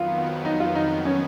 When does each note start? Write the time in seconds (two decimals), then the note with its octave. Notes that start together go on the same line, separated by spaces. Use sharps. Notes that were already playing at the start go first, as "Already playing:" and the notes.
Already playing: F2 D#3 F#3 B3 F4
0.45 D#4
0.60 F4
0.75 D#4
1.05 C#4